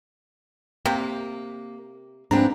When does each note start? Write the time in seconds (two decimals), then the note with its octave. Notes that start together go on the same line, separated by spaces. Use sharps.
0.86 C3 A#3
2.31 G#2 F3 C4 D4 B4 A#5